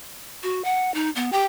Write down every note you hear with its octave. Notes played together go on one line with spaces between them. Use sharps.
F#4
F#5
D#4
B3
G4 G5